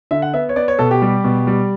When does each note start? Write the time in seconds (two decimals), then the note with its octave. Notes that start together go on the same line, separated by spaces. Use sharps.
0.11 D3 E5
0.22 F#5
0.34 B3 E5
0.49 C#5
0.56 B3 D5
0.68 C#5
0.79 B2 A4
0.91 G4
1.02 G3
1.24 B2
1.47 G3